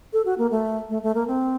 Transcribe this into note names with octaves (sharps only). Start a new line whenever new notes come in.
A4
F#4
A#3
A3
A3
A3
A#3
C4